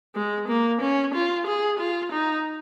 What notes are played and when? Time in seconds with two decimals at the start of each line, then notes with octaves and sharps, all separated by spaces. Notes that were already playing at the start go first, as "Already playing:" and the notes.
0.15 G#3
0.48 A#3
0.81 C#4
1.14 F4
1.47 G#4
1.79 F4
2.12 D#4